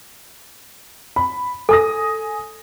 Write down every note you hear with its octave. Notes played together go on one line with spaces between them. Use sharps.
B5
A4 G#5 D#6 A#6